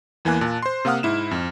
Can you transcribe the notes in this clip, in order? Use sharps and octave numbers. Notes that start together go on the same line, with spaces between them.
E2 E3 A#3 G#5 F#6
A#2 A5
C5 C6
C3 A#3 F5 F#5 D#6 F6
G#2 E4 E7
F2